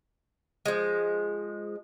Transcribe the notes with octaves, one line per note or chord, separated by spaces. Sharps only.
F3 G#3